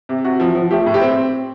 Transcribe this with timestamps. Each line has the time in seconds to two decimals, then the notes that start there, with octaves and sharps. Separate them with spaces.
0.09 C3
0.24 C3 F#4
0.40 F3
0.55 F3
0.71 A3 G4
0.86 A2
0.94 G4
1.01 C4